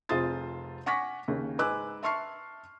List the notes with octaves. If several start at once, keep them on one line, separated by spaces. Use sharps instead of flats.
F1 F4 G#4 C5 D#6 A6
F#5 G#5 C#6 D6 A#6 B6
D#2 C#3
G#2 B4 G#5 D6 E6 F#6
E5 A5 C6 C#6 F6 C7